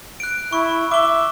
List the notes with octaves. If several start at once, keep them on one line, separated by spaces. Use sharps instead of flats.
F#6 D7
E4 C#6
E5 D6 G7